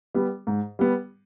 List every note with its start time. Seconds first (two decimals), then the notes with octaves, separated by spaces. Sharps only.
0.14 G3 B3
0.47 G#2
0.79 G3 B3